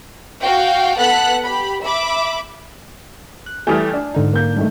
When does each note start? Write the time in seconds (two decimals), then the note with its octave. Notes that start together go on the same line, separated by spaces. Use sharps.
0.42 F#4 F5 G5
0.96 B3 A4 F#5 F#6 B6
1.42 G4 B5
1.83 E5 B5 D6
3.46 F#6
3.67 E3 G3 A3 G#5 D#6 F6 G6
3.93 D4
4.15 G#2 D3 D#4
4.33 A#3 G6
4.56 G2 D#3 A3